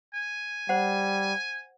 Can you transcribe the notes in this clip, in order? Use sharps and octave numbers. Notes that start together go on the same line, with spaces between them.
G#5
G3 C5 F#5